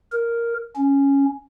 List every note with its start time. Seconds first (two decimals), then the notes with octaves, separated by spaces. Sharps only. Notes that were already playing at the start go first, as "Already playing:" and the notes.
0.12 A#4
0.76 C#4